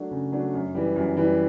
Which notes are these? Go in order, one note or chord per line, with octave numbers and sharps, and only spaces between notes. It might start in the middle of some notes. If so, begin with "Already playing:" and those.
Already playing: F#3 A3 D4
C#3
F#3 A3 D4
F#2
E3 G3
F#2
E3 G3